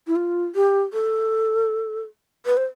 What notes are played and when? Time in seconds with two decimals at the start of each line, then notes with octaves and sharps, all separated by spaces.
0.07 E4
0.16 F4
0.55 G4
0.93 A4
2.46 B4
2.57 C5